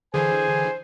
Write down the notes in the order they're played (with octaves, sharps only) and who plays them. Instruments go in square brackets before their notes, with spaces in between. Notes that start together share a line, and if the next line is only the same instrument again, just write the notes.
[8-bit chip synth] D3 E3 [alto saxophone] G#4 [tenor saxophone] C5 [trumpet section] G#5